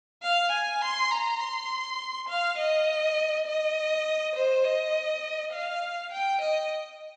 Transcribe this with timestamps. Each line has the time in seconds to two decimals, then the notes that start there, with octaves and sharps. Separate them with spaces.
0.22 F5
0.52 G#5
0.82 C6
1.11 A#5
1.40 C6
2.28 F5
2.58 D#5
3.47 D#5
4.35 C5
4.65 D#5
5.53 F5
6.12 G5
6.41 D#5